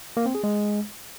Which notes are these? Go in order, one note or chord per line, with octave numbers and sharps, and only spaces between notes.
A#3
C4
G#4
G#3